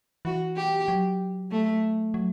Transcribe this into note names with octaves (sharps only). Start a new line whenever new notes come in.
E3 F#4
G4
F#3
A3
F#3